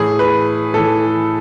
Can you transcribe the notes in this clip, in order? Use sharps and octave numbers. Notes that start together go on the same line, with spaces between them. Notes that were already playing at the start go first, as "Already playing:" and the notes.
Already playing: A2 E3 G#4
B4
A2 E3 A4